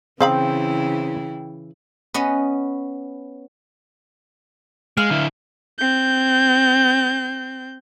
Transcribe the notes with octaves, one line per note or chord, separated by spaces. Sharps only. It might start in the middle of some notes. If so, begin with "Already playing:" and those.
C#3 E3 C4 E4 G#4 F5 G5 B5
B3 C#4 D#5
G#3 F5
D3 E4
C4 G6